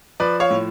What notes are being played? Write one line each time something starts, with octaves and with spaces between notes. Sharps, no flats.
F3 B4 D5
C#5 F5
A2